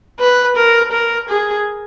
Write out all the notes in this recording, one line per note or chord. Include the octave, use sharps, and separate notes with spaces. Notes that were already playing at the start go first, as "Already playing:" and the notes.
B4
A#4
A#4
G#4